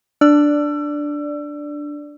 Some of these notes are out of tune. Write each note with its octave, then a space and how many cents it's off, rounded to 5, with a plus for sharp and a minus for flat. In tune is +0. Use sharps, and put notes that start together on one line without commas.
D4 +0 D5 +0 E6 +30